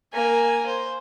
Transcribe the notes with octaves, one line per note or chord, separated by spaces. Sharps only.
A#3 G#5
C5